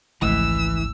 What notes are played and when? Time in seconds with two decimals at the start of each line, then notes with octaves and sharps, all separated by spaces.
0.22 G#1 C#2 E3 F3 G#3 A3 E6